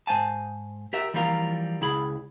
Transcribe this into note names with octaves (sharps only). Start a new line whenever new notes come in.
G#2 B3 C5 G#5 A5
G4 A#4 E5
E3 F3 G3 A#3 F4 A#4
C#2 E4 G#4 B5